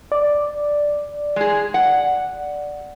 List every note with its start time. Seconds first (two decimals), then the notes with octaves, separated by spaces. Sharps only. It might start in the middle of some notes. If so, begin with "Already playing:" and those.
0.12 D5
1.36 G#3 G#4
1.74 F#5